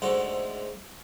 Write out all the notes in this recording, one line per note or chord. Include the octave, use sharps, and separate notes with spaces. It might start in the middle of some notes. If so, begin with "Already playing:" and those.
G#2 D3 A3 F#4 C5